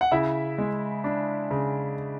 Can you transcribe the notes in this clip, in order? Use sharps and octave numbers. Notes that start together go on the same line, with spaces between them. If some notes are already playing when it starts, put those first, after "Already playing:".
F#5
C#3 E4 E5
G#3
D4
C#3